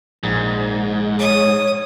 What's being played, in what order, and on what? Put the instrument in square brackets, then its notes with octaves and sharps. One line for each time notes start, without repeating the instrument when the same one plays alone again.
[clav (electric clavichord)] A#1 [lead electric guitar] G#2
[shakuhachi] C#5 [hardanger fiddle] D#6